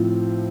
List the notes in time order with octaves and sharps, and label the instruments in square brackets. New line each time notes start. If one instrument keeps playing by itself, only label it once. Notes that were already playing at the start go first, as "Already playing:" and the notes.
Already playing: [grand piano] A2 F3 C4